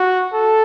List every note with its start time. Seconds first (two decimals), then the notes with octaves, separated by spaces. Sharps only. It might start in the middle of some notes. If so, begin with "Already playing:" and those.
Already playing: F#4
0.34 A4